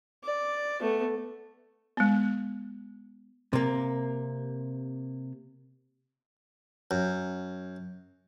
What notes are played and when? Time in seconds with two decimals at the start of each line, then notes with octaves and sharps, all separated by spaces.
0.24 D5
0.81 A3 B3
1.97 G#3 B3
3.53 C3 A#3
6.91 F#2